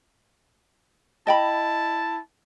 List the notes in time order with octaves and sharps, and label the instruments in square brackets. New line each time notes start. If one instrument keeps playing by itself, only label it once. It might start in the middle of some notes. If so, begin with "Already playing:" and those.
[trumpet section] E4 A5 [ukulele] D#5 G5 B5